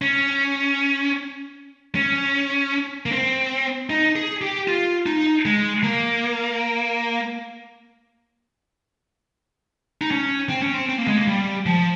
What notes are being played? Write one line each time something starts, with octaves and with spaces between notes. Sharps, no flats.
C#4
C#4
A#3
C4
D#4
G#4
G4
F4
D#4
G#3
A#3
D#4
C#4
C4
C#4
C4
C4
A#3
G#3
A#3
G3
F3